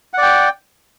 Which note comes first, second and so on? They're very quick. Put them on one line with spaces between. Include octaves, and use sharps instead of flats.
F#5 D5 G5